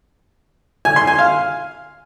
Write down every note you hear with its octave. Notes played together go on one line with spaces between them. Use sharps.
G#5
C6
G#5
F5